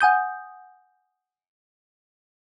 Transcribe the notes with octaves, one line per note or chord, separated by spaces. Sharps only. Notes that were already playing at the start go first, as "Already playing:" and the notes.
F#5 G#5 D#6 G6